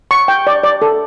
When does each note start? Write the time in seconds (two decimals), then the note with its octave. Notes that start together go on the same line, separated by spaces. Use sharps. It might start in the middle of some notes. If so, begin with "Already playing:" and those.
0.11 C#6
0.28 G5
0.47 D5
0.63 D5
0.82 A4